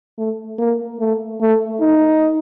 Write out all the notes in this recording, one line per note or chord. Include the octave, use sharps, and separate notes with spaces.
A3
A#3
A3
A3
D#4